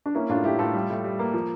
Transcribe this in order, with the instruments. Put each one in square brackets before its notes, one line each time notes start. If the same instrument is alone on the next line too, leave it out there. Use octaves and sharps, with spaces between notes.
[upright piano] D4
A#3 C#4 E4
A2 D4 F4
A2 E4 G4
A2 F4 A4
G3
A2
G3
A#3
F3